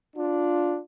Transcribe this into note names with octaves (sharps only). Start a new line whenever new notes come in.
D4 F4